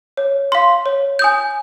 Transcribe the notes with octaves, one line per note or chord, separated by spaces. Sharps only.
C#5
F5 C6
C#5
G#5 D#6 G6